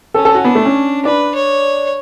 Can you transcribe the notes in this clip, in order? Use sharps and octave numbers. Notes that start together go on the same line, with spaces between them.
C#4 A4
A4
F#4
B3 D4
A3
C#4
D4 B4
C#5